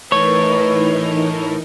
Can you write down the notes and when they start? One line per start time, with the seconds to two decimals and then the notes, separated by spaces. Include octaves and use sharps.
0.12 A2 E3 A3 D#4 A#4 B4 C#5